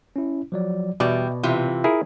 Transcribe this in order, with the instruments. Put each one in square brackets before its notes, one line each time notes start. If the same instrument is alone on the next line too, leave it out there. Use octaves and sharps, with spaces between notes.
[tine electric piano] C#4 E4
F3 F#3 D5
[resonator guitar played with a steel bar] E2 G3 [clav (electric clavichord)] B2 D5 [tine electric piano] E5 G5
[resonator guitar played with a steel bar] C3 E3 [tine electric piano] F4
[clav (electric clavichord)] E4 G#4 A#4